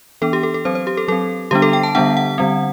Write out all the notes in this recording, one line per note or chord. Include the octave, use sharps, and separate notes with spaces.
E3 B3 D4 A4
G4
A4
A4
F#3 C4 C5
C5
G4
A4
F#3 C4 A4
D3 G3 B3 D4 G4
A4
G5
A5
D3 G3 B3 D4 F#5
F#5
D3 G3 C4